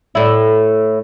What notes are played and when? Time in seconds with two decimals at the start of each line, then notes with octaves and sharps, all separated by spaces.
0.15 A2 E4